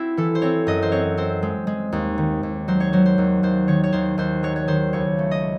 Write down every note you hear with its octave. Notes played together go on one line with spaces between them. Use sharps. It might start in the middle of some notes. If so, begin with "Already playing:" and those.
Already playing: C4 E4 F#4
E3 A4
C5
C4 C#5
F#2 D#5
C5
C4 C#5
C4 C5
G#3
G#3
D#2
D#3
D#2
F#3 C5
C#5
F#3 C5
C5
D#2
D#2 C5
D#3 C#5
C#5
D#2 C5
D#2 C5
F#3 C#5
C#5
D#3 C5
C#2 C#5
A3
D#5